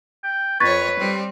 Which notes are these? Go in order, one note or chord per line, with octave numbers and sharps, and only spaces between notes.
G5
F2 B4 C#5 C#6 G#6 A6
G3 C4